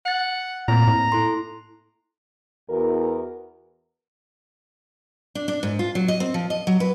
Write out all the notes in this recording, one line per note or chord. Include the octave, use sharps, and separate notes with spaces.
F#5 A6 C#7
A#2 A3 A#3 C4 A#5
A2
E4 A4 C6
E2 F#4 A#4
D4
D4
G#2
F4
F#3
D#5
C4
F3
D#5
F#3
B4